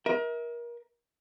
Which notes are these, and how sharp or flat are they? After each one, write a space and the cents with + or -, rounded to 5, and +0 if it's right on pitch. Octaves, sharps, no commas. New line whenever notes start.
A#4 +30 E5 -40